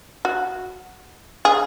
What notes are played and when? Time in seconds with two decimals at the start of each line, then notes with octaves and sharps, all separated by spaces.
0.25 F#4
1.45 G#4